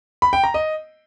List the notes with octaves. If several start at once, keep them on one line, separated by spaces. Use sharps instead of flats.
B5
G5
A#5
D#5